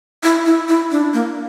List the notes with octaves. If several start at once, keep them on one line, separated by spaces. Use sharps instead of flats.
E4
E4
E4
D4
A#3